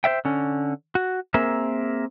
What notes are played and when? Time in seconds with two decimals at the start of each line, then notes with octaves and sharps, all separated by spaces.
0.04 C5 D5 E5 G5
0.25 D3 C#4
0.95 F#4
1.34 A#3 C4 G#4 A#4 E5